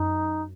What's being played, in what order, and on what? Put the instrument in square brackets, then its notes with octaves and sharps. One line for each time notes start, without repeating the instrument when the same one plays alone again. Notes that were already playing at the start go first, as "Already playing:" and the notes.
Already playing: [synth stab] F#2 [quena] D#4